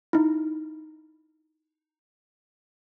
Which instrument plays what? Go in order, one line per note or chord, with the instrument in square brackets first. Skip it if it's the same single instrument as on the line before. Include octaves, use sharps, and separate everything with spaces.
[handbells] D#4 E4